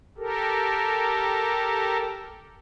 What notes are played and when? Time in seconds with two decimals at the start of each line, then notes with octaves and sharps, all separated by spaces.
0.18 G4 A4 A#4